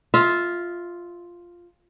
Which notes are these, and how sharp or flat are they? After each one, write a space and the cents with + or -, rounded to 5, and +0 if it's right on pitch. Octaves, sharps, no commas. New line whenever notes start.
F4 +0 E5 -25